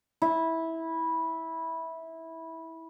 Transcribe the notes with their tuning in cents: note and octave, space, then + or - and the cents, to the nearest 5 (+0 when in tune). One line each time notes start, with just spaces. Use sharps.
E4 -15